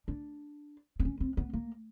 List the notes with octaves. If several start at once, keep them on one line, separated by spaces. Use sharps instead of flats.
D4
C4
C#4
C4
B3
A#3